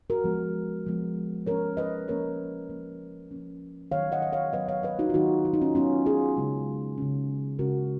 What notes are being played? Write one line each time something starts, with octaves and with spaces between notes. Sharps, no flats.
F#4 A#4
F3 G#3 B3
F3 G#3 B3
F3 A#3 C#4 A#4 C#5
B4 D#5
F3 A#3 C#4 A#4 C#5
F3 A#3 C#4
F3 A#3 C#4
D#3 F#3 B3 C#5 F5
D#5 F#5
D#5
C#5 F5
D#3 F#3 B3 B4 D#5
C#5 F5
B4 D#5
D#4 F#4
F4
D#3 F#3 B3 D#4 F#4
F4
D#4
C#4 F4
D#3 F#3 B3 C#4 F4
F4 G#4
C#3 G#3 C#4
C#3 G#3 C#4
C#3 G#3 C#4 F#4 A#4